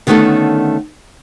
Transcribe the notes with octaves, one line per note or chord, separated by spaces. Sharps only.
D3 D#3 A3 B3 C#4 A4